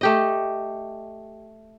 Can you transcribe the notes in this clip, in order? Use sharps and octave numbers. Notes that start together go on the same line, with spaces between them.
A3 G4 D#5